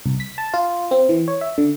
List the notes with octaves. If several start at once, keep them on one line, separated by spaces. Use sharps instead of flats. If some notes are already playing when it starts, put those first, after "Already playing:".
C2
B6
A5
F4
C4
E3
C#5
E5
D3